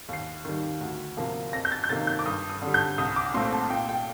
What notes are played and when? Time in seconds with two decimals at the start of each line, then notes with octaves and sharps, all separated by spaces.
0.09 D#2 C7
0.45 D#3 G3
0.81 D2
1.17 C3 F3 A#3
1.53 F2 A#6
1.65 G6
1.72 A6
1.84 G6
1.90 C3 D#3 A#3 A6
2.07 G6
2.19 D6
2.26 G2 D#6
2.50 D#6
2.62 D3 G3
2.74 G6
2.98 C2 D#6
3.16 D6
3.34 A#2 A3 C4 C6
3.53 A5
3.70 A#2 G5
3.89 G5